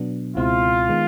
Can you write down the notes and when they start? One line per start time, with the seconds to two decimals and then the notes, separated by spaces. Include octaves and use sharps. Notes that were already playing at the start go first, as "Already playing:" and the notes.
Already playing: B2 F#3 B3 D4
0.36 C#2 B2 G#3 C4 E4 F4
0.89 D#3 G#3 B3